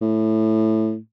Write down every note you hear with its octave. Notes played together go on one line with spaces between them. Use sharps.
A2